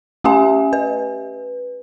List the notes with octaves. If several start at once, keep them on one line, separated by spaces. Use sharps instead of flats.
A3 C#4 G4 E5 G#5
B4